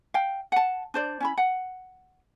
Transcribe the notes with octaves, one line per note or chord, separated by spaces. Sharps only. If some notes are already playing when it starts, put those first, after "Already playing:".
F5 G5
F#5 A5
D4 C5 D5
C#4 E4 B5
F#5